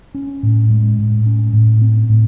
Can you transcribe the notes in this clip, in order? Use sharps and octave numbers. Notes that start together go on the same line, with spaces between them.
C#4
A2
G#3
A2
C#4
A2
C4
A2